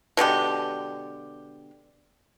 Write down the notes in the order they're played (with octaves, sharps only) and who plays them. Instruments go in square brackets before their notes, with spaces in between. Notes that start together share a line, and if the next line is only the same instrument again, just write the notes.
[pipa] B2 D3 G#3 G4